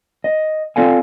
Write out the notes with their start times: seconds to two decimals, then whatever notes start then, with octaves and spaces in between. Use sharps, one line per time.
0.24 D#5
0.76 C4 F4 A4 D5 F5 G#5